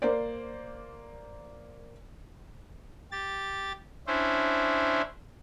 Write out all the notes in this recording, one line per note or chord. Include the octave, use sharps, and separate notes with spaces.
A#3 C5 D5
G4 A6
C#4 D4 E4 C5